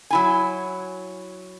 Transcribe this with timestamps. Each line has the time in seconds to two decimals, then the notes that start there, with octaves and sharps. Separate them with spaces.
0.10 F#3 E4 G#5